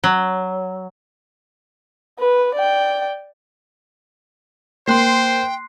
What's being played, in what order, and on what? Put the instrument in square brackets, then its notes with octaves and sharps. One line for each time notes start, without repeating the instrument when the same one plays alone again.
[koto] F#3
[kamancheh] B4
D5 G5
[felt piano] A#3 [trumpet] C5 [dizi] G5 [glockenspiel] C6 F#6 C7